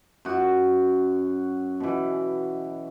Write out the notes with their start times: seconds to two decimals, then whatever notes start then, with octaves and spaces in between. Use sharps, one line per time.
0.25 F#2 F#4
1.80 B2 E3